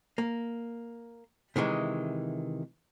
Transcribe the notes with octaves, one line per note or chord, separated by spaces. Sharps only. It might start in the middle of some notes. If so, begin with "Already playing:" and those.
A#3
C3 D#3 E3 G#3